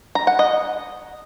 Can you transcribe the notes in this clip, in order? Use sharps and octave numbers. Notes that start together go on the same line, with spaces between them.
A#5
F#5
D#5